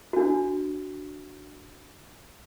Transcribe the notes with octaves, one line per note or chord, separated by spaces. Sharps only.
D4 F#4